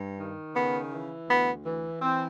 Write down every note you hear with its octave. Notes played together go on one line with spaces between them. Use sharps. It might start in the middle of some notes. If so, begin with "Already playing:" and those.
Already playing: G2
D#3
C#3 B3
E3
D2 B3
E3
E3 C4